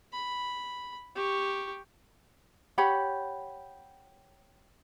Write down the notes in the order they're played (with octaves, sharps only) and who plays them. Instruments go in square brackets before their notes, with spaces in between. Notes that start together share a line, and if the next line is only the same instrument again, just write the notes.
[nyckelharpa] B5
G4 C#6
[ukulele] G4 C#5 F#5 B5